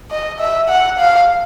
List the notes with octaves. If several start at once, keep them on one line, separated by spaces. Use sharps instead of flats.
D#5
E5
F#5
F5